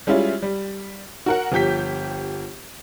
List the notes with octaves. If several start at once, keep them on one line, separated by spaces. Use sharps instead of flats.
G3 G#3 C#4 E4 F4
G3
F#4 A#4 F#5
G1 F3 G4 G6 B6